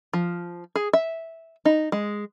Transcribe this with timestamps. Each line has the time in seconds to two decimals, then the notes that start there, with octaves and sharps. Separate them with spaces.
0.13 F3
0.76 G#4
0.93 E5
1.65 D#4
1.92 G#3